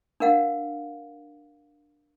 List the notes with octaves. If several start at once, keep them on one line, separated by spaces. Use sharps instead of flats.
D4 A#4 F5 F#5